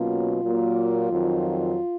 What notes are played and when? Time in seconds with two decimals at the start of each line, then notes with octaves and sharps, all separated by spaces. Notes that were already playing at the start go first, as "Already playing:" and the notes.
Already playing: B2 F#3 A#3 C#4 F4
0.42 A#2 F#3 A#3
1.10 F2 D#3 F#3